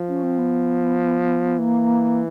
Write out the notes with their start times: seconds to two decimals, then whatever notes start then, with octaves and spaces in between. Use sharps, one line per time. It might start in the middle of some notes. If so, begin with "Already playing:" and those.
Already playing: F3
0.09 C#4
0.23 C4
0.38 B3
1.59 E3 A#3